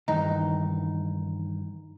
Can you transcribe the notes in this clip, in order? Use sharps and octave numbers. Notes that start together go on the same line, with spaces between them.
G2 D#3 E3 D#4